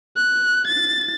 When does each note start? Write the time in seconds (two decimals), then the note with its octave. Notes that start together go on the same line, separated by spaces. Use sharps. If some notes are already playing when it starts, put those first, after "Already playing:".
0.17 F#6
0.67 A6